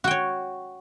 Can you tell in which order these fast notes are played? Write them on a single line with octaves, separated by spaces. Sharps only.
F#4 G5 C#5